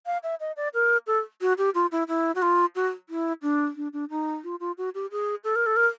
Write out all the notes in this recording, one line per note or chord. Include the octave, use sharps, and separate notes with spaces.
F5
E5
D#5
D5
A#4
A4
F#4
G4
F4
E4
E4
F#4
F4
F#4
E4
D4
D4
D4
D#4
F4
F4
F#4
G4
G#4
A4
A#4
A4
A#4